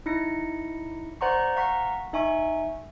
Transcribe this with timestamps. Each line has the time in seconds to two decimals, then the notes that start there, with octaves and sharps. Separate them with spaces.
0.06 D#4 E4 A#6 C#7
1.21 C5 D5 F#5 A#5 C6 C#6
1.56 F5 F#5 A#5 C#6 B6
2.13 D#4 E5 G#5 C#6